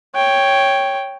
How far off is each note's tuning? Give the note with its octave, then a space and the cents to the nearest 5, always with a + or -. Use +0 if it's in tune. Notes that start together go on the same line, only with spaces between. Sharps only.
C#5 +0 G5 +0